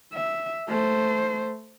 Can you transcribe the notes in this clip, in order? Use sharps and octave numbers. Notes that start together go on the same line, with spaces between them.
E5
A3 C5